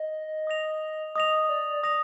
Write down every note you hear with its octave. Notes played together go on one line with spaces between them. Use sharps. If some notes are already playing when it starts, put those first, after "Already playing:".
Already playing: D#5
D#6 A#6 F7
D#5 D#6 A#6 F7
D5
D#6 A#6 F7